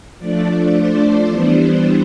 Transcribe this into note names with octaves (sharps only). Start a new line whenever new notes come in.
F3 A3 D4 D5
C5
E3 G3 B3 D4